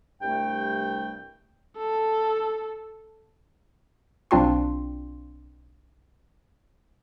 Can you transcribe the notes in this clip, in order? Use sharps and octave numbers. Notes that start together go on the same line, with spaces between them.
C2 G2 A3 G5
A4
B1 C4 D4 F4 G5 C6